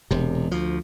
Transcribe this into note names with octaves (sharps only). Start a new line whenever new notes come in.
E1 C3
D2 F3